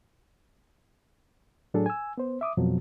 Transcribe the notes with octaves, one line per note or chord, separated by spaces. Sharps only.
A2 F#3 D4 G#4 A4
G#5 E6
B3 C5
E5 D6 D#6
F2 B2 F3 F#3